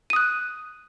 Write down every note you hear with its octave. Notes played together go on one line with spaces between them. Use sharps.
D#6 F#6 D#7